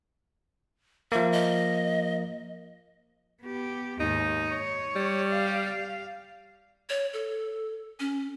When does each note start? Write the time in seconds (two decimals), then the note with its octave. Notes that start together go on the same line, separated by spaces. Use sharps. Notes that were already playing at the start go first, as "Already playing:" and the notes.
1.12 F3 A#3 E5
1.32 D#5
3.42 B3 G4
4.00 D#2 G#2 D#4
4.49 C#5
4.96 G3
5.32 F5
6.89 C#5
7.13 A4
8.00 C#4